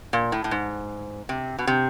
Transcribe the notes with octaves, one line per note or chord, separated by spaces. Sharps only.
A#2
A2
A2
G#2
C3
B2
C3